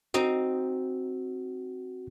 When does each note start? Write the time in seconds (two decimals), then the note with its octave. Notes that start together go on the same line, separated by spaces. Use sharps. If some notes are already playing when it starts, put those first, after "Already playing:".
0.14 C4 D#4 F#4